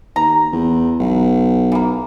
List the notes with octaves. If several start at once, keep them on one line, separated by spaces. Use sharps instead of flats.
D#2 A#5
E2
B1
E3 A#3